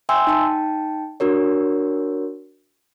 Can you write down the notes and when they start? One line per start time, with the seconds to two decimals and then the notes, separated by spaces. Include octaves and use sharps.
0.09 E5 G5 G#5 C6 E6
0.27 D#4 G5 A5
1.20 D4 F#4 A#4 C#5